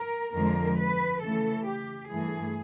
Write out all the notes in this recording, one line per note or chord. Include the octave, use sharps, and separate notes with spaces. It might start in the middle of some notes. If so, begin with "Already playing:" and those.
Already playing: A#4
F2 D3 F3 G#3 A#4
B4
C#3 E3 A3 A4
G4
G2 E3 A3 G#4